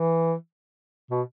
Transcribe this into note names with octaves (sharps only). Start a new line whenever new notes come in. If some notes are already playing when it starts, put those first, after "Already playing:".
Already playing: E3
B2